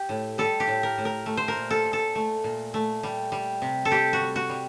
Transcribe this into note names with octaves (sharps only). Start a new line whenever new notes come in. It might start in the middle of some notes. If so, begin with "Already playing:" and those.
Already playing: G4
A2
G3 A4
G4
A2
A#4
A2
A#4
A3
C5
A#4
A#2
A4
A#2
A4
A3
A#2
A3
G3
G3
C3
A4
G3 G4
F#4
G3
F#4
G3